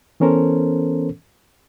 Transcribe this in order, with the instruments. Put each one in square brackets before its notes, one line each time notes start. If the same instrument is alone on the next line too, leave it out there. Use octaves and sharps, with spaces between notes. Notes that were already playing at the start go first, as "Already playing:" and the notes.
[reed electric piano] E3 B3 C#4 A4 A#4 C5